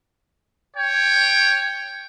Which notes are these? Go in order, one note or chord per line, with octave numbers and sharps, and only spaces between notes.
C#5 G5